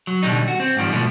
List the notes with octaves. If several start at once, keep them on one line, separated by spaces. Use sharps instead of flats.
F#3
B2 D3 D#3 F#3 G3 D#4
F#4
C4
G#2 D3 D#3 F3 G3
B2 F3 A3